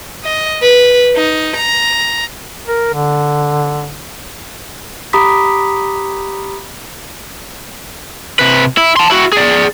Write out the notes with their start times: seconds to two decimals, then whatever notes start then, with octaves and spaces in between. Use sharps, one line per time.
0.24 D#5
0.62 B4
1.16 D#4
1.57 A#5
2.67 A#4
2.93 D3
5.13 G4 A#5 B5 D6 D#6 B6
8.39 C3 B4
8.77 E4
8.97 A5 C6
9.10 E4 F#4
9.33 G#4 D5